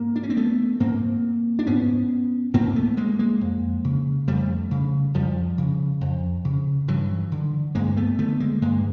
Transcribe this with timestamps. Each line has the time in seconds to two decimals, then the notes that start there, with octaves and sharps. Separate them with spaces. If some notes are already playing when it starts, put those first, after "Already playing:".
Already playing: G#2 A#3
0.16 D4
0.23 C#4
0.30 C4
0.37 A3 B3
0.80 G#2 A#3 C4
1.59 D4
1.67 G#2 B3 C#4
2.54 G#2 A#3 C4
2.75 A3 B3
2.97 G#3 A#3
3.19 G#3 A#3
3.41 F2
3.84 C#3
4.27 F2 G3 A3
4.71 C#3
5.14 F2 F3 G3
5.58 C#3
6.01 F2
6.45 C#3
6.88 G2 E3 F#3
7.32 D3
7.75 G2 G#3 A#3
7.97 A3 B3
8.19 D3 A3 B3
8.40 G#3 A#3
8.62 G2 G#3 A#3